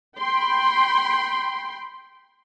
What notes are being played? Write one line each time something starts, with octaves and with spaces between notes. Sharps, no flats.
G5 B5 C6